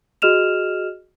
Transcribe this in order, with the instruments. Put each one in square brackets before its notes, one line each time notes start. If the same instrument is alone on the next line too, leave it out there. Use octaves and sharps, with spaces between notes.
[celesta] F#4 G#4 D#5 F6 E7 F7